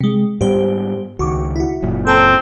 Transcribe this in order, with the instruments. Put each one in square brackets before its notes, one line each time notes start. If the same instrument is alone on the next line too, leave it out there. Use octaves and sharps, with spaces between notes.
[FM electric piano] C3 G#3
[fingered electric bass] G#2 G3 B3 [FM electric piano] G4 C5
[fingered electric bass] C#2 D#3 [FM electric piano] F#4 C#6 D6
[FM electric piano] E4 F#4
[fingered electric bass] F#1 F#2 A#2
[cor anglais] C4 [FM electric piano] A4 A5 A#5